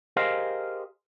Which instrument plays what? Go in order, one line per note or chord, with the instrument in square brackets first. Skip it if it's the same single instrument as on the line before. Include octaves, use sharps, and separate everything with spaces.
[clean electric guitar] G4 G#4 A#4 C5 D#5 F5